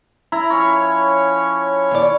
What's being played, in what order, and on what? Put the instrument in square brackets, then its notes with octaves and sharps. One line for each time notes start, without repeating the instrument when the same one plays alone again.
[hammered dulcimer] E4 [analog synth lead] A#5
[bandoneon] F3 C#4 [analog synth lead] C#5
[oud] D#2 D5